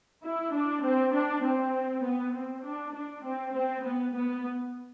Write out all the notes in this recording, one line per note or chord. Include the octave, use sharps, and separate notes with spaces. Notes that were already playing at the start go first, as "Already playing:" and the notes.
E4
D4
C4
D4
C4
B3
C4
D4
D4
C4
C4
B3
B3